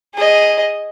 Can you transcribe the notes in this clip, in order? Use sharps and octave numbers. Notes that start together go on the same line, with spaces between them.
G#4 D#5